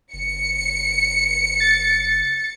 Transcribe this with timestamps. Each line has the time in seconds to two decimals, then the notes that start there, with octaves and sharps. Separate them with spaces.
0.14 F#1 C#7
1.60 A6